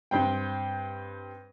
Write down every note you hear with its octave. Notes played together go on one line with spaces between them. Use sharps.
G2 C4 G5